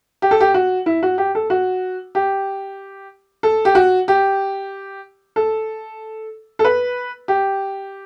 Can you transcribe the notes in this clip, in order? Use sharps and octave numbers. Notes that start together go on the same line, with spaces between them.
G4
A4
G4
F#4
E4
F#4
G4
A4
F#4
G4
A4
G4
F#4
G4
A4
A4
B4
G4